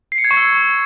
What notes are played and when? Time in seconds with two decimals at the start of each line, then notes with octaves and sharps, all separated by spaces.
0.12 C7
0.18 C#7
0.24 G#6
0.31 C#6
0.37 E6